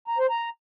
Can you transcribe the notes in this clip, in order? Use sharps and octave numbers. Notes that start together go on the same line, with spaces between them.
A#5
C5
A#5